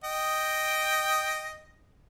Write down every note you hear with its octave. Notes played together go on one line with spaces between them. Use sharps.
D#5 G5